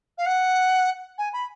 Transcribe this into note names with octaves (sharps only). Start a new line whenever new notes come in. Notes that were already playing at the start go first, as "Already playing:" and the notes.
F5
F#5
G#5
B5